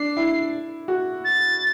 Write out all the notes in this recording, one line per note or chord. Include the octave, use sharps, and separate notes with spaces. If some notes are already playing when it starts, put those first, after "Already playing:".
Already playing: D4 C7
E4
F#4
A6